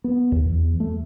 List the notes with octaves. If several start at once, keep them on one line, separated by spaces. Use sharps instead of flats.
B3
D#2
E2
A3